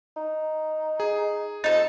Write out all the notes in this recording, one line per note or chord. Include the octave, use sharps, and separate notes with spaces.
D#4
G#4
F2 D#4 A4 A6